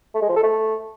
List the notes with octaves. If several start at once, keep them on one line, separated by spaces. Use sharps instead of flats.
A3
G#3
F3
A4
A3